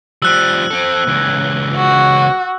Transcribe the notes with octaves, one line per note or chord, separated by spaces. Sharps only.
F3 G3 E6 F#6
C4 A4
C#2 E3
F#4